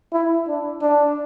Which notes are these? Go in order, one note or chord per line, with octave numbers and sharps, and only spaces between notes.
E4
D4
D4